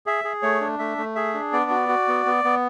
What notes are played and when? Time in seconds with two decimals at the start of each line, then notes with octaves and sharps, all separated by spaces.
0.06 G#4 E5
0.24 G#4
0.42 A3 C#5
0.61 D4
0.79 A3 E5
0.98 A3
1.15 G#4 E5
1.34 D4
1.53 B3 D5
1.71 F#4
1.89 F#4
2.08 B3
2.26 B3
2.44 B3